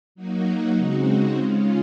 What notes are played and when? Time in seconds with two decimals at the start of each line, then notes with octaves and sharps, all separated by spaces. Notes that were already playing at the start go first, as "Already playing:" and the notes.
0.15 F#3 A#3 D#4 F#4
0.76 C#3 G#3 C4 D#4 F#4
1.37 C#3 G#3 C#4 F4